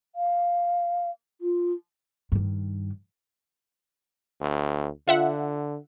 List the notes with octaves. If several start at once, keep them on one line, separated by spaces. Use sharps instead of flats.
F5
F4
G2 D#3
D2
D3 F4 E5 F#5